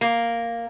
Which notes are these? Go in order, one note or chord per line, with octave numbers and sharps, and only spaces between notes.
A#3